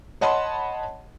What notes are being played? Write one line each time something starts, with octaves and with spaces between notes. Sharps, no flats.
C#5 D#5 F#5 A5 B5 C6